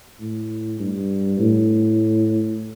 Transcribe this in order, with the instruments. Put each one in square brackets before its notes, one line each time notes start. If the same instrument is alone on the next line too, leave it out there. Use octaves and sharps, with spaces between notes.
[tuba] A2
G2
A2